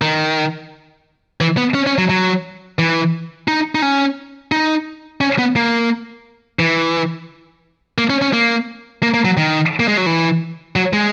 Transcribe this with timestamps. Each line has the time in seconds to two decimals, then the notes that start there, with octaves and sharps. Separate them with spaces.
0.02 D#3
1.41 E3
1.57 B3
1.74 C#4
1.86 C#4
1.98 F#3
2.09 F#3
2.79 E3
3.48 D#4
3.75 D#4
3.82 C#4
4.52 D#4
5.21 C#4
5.39 B3
5.56 A#3
6.59 E3
7.98 A#3
8.10 C#4
8.22 C#4
8.33 A#3
9.03 A#3
9.14 A#3
9.25 F#3
9.37 D#3
9.80 A#3
9.88 G#3
9.97 F#3
10.06 E3
10.76 F#3
10.93 G#3